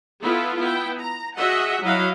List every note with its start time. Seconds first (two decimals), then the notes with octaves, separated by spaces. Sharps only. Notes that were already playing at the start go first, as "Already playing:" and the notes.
0.23 B3 E4 F4 A4
0.58 B3 E4 G5
1.00 A#5
1.36 F#4 G#4 D#5 E5 F#5
1.82 F#3 E4 D#5 F5 F#5